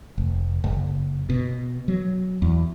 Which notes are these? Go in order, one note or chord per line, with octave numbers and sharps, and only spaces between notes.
F1
F#1
B2
F#3
E2